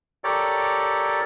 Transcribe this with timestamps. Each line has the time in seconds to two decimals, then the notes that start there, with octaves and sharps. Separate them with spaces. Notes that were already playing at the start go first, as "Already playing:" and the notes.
0.24 G4 A4 A#4 C#5 D5